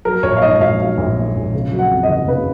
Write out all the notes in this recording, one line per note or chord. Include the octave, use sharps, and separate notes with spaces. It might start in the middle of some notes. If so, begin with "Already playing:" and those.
F#3 A#4
A#1 C#5
F5
G#2 D#5
D#5
A#1 F5
F#3 F5
A#1
G#2
A#1
C#3
F#3
F#5
F2
D#5
F#1
C#3 B4